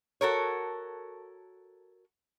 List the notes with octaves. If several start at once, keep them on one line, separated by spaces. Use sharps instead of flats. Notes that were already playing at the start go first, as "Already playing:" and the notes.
F#4 A4 A#4 C#5